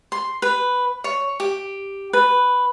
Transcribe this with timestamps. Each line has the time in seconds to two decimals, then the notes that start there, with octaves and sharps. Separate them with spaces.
0.12 C6
0.42 B4
1.04 C#5
1.40 G4
2.13 B4